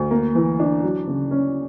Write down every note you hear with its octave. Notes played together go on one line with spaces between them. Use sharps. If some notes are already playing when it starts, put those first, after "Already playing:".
Already playing: D2
A#3
E3
D4
F#3
C#3
C#4